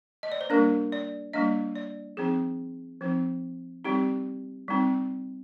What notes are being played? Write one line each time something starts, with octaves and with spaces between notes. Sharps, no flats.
D#5
D5
C5
G3 A#3 D4 A#4
D5
G3 A#3 D4 D#5
D5
F3 C4 D#4 G#4
F3 C4 D#4
G3 C4 D#4 G4
G3 C4 D#4